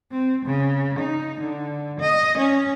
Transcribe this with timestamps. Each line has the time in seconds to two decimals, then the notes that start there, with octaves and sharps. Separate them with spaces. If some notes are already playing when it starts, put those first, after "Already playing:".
0.11 C4
0.45 C#3
0.99 D#4
1.40 D3
2.00 D#5
2.38 C#4